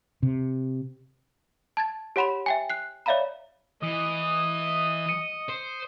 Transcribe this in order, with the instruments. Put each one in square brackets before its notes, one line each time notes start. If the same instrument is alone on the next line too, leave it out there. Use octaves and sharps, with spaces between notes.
[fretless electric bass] C3
[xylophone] A5 G#6 A6
G4 C#5 F#5 B5 C6 F7
E5 G5 G#5
F#6 C7
C#5 D5 E5 F5 A#5 B5
[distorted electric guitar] E3 [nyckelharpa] D#5 [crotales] D#6
[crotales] C#7 D#7
[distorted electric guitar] C5